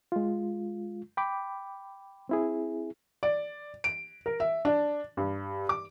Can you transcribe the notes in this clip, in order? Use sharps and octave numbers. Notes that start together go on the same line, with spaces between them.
G#3 F4
G5 B5 D6
C4 E4 G#4
D5
D7
A#4
E5
D4
G2
D6